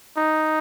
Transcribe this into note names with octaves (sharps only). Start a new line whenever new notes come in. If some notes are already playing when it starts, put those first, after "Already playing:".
D#4